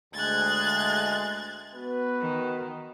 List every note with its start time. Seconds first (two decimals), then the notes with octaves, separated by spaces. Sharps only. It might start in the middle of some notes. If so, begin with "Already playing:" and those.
0.14 D2 G#3 F#6 G#6 A6
1.74 B3 F#4 B4
2.19 D#3